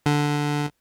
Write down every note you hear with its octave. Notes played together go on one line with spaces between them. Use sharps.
D3